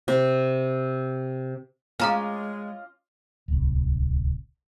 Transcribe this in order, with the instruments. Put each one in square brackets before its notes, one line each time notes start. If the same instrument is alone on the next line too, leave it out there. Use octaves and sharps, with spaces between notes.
[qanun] C3
[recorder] G#3 [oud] C#4 [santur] F4 D#5 D6 [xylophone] F5 A#5 F6
[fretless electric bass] D1 C2